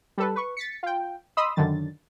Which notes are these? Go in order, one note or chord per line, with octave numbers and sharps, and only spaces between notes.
G3 A4 B4
B4 C#6
A6 B6 C#7
F4 G5
D#5 B5 C6 D#6 E6
F#2 D3 D#3 A6